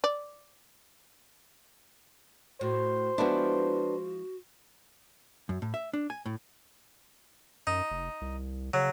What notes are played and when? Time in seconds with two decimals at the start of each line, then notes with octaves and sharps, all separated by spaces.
0.04 D5
2.61 A2 F#4 C5
3.18 F3 G#3 B3 D4 E4 F#4
5.49 F#2
5.62 A2
5.74 E5
5.93 D4
6.10 G#5
6.26 A2
7.67 F#2 D#4
7.91 F1
8.21 C2
8.74 C#3 F#3